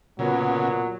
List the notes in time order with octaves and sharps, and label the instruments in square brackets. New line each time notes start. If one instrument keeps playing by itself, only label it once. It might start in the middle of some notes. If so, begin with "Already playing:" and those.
[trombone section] A#2 [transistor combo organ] C#3 [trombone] F#3 [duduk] B3